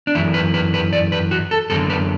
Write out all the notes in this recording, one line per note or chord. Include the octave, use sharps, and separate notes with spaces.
D4
F#2 E3 E4
B4
B4
B4
D5
B4
F#4
A4
F#2 D3 A4
B4